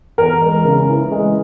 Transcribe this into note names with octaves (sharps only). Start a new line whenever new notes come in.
E2 A#4
G#3
C#3
E3
G#3